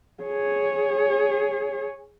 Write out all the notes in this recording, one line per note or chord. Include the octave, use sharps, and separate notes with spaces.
G#4 C#5